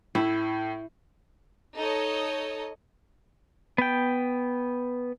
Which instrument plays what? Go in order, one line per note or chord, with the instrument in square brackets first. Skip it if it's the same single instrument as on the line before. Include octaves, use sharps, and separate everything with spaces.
[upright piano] A2 [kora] E4
[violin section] D#4 A4 C#5 D#5
[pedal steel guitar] B3 G5